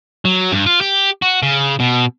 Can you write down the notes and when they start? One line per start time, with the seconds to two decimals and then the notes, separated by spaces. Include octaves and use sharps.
0.25 F#3
0.52 G2
0.66 F4
0.81 G4
1.22 F#4
1.43 C#3
1.80 B2